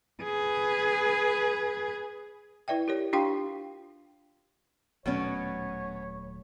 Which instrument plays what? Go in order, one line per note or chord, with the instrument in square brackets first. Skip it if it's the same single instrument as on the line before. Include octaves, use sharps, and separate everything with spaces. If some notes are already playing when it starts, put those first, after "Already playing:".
[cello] G#4 B4
[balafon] E4 B4 D5 E5 G5
G4 A#4 C#5
D4 F4 G4 F5 G5 C6
[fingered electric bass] D#1 F#3 A3 [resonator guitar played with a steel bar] B2 B3 C#4 [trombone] C#5